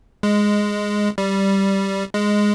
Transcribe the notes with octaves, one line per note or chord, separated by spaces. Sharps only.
G#3
G3
G#3